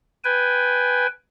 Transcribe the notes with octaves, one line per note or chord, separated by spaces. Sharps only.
B4 G5 G#5